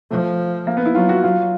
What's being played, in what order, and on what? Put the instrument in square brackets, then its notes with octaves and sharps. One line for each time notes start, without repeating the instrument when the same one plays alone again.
[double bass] F3 [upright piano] A3
[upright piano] A#3
B3
E4
[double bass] F#3 [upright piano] F4
[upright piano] F#4
[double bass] F#3 [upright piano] F4